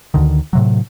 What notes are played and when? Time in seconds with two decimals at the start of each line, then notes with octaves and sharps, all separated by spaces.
0.14 D2 D3 D#3
0.53 A2 C3 F#3